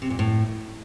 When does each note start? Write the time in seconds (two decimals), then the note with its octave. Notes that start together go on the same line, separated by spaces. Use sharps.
0.02 C3
0.10 A#2
0.19 A2